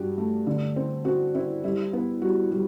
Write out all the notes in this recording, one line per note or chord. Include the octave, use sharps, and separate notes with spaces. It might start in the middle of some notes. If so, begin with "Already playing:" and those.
Already playing: G2 F#4 G4
A3
D3
C4
C4 F#4
C4 E4
G3 E4
B3
G3 F#4
G3